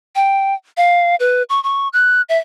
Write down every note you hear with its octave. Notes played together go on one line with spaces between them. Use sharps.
G5
F5
B4
C#6
C#6
F#6
E5